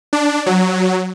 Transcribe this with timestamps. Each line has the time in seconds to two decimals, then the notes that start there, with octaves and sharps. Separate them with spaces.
0.13 D4
0.46 F#3